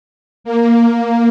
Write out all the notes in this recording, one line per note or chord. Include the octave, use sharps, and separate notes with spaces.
A#3